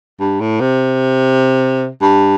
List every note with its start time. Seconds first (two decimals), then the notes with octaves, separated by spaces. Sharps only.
0.20 G2
0.40 A2
0.60 C3
2.02 G2